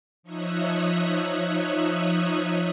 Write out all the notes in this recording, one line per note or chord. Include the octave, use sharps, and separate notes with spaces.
F3 D#4 C#5 E5 D#6 F#6